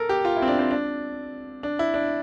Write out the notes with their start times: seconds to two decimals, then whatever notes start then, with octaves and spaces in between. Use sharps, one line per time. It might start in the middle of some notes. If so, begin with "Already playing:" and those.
Already playing: A4 A#4
0.09 G4
0.25 F4
0.36 E4
0.42 C4
0.47 D4
0.59 C4
0.71 D4
1.63 D4
1.79 E4
1.94 D4